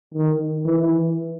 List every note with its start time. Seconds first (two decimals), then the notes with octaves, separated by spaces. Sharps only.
0.14 D#3
0.65 E3